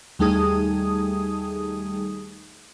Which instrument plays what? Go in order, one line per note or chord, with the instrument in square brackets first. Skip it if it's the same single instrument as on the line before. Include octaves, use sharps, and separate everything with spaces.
[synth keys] D#2 G3 A3 D#4 G#4 D#6